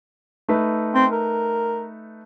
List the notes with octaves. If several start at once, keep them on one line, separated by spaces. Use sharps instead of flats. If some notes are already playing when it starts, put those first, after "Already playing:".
A3 D#4 B4
C4
A#4